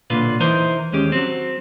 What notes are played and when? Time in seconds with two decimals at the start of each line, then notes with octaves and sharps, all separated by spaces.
0.10 B1 A#2 D3 F4 B4
0.40 E2 E3 D#4 A#4 C5
0.92 D#2 G#3 C#4 G4
1.12 F#3 C4